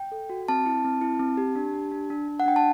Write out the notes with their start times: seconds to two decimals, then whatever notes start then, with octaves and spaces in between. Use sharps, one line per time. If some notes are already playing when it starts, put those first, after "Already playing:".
Already playing: G5
0.12 A4
0.30 F#4
0.48 C4 A5
0.66 E4
0.85 C4
1.01 E4
1.20 C4
1.37 G4
1.56 D4
1.74 G4
1.92 D4
2.10 D4
2.28 D4
2.40 F#5
2.46 D4 G5
2.56 A5